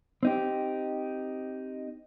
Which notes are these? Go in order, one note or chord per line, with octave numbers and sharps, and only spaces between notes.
C4 D#4 G4